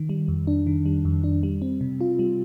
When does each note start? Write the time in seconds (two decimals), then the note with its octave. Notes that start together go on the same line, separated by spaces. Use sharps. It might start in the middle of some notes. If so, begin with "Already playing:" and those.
Already playing: D#3
0.09 G3
0.28 F2
0.47 D4
0.67 D#3
0.86 G3
1.05 F2
1.24 D4
1.43 G3
1.62 C4
1.81 C3
2.01 F4
2.19 G3